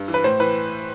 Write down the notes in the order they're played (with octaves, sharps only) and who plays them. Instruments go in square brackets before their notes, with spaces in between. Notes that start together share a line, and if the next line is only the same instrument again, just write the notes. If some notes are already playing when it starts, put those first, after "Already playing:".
Already playing: [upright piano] G2
E3
B4
A2 C5
E3 B4